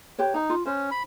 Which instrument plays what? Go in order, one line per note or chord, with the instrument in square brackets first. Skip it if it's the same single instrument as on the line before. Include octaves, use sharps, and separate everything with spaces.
[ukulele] G4 B4 C#5
[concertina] D#4 [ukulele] A#5
[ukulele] F4
[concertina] C#4 [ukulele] C5
[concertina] B5